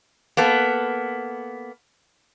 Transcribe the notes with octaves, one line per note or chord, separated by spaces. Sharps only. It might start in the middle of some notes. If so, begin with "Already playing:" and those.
A#3 B3 A4